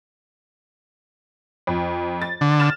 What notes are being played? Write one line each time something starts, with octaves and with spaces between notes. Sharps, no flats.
F2
A6
D3
F6 A6 E7